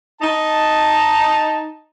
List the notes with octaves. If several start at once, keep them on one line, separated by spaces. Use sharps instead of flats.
D#4 A5